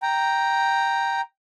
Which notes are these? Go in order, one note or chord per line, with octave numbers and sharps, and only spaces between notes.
G5 A#5